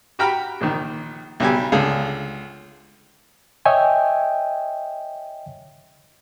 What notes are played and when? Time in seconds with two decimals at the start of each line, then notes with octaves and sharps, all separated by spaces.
0.19 F#4 G4 G5 A#5 B5 F6
0.61 A#1 D#3
1.40 B1 G3 G4 G#5
1.72 C#2 D3 G#4 F5
3.66 C#5 D#5 E5 G5 G#5